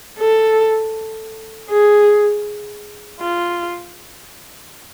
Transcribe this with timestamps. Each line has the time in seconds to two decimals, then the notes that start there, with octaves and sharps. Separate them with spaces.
0.19 A4
1.70 G#4
3.21 F4